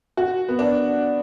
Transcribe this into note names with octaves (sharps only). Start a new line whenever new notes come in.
F#4
B3
D4